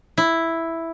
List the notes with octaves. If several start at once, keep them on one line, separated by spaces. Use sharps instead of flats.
E4